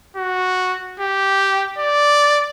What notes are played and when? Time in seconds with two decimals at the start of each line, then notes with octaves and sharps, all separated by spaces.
0.17 F#4
1.00 G4
1.78 D5